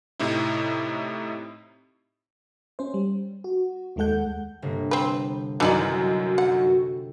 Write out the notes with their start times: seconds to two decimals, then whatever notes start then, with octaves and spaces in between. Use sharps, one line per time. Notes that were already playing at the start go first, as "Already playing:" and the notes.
0.20 A2 C3 D#4 E4
2.79 C#4 C5
2.94 G3
3.44 F#4
3.96 D#2 D#3 G#3 A4 F#5 G6
4.62 G1 C3 A#3
4.91 C4 B4
5.60 F#2 D#3 E3 D#4 F#4 D5
6.38 F#5